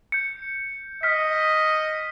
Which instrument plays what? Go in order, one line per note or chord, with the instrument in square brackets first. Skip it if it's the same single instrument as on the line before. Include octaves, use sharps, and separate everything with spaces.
[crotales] G6 C#7
[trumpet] D#5 [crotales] F6 B6